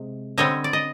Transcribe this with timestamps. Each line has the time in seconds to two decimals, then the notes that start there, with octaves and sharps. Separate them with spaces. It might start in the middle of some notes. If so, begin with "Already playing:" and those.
Already playing: C3 G#3
0.38 D3 G3 C4 C#5 D#5
0.64 D5
0.73 D#5